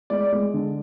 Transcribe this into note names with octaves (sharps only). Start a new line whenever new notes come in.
G#3 D5
G#3
D3